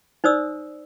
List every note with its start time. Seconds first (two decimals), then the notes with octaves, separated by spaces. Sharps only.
0.24 D#4 C5 D5 D#6 E6